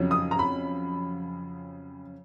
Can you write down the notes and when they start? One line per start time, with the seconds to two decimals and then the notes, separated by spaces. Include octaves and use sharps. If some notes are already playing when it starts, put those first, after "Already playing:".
Already playing: F2 C#3 F#3
0.11 D#6
0.31 A#5
0.39 B5